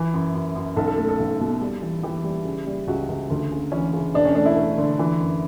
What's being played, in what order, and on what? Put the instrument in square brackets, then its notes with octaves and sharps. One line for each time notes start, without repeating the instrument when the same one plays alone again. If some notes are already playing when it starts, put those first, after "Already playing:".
Already playing: [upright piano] E3
F#2
F#2
F#2
B1 A4
A4
A3 A4
A4
B1
B2
G3
E3
E3 G4
G3
C#3
G3
C#2 F#4
C#2
D2
C#3
E3 C#4
C#3
E1 D4
C#4
A3 D4
E4
A3
D3
E3
F#2